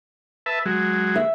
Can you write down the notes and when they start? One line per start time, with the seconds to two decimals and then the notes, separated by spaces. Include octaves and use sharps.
0.46 B4 E5 A5
0.66 F#3 G#3
1.15 E5